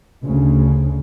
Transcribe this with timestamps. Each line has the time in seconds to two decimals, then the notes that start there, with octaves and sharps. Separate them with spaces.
0.24 D2 C#3